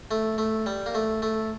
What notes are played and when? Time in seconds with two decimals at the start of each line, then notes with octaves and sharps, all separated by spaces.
0.11 A3
0.38 A3
0.66 G3
0.86 A#3
0.95 A3
1.22 A3